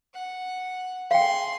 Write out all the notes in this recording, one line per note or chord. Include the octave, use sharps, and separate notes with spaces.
F#5
G#4 F5 G5 C6